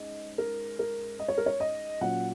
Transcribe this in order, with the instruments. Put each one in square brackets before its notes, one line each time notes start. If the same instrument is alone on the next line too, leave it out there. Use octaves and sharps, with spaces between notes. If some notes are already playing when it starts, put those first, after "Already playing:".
Already playing: [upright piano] G#2 C#4 D#5
A#4
A#4
D#5
C#5
A#4
C#5
D#5
A#2 F#3 C#4 F#5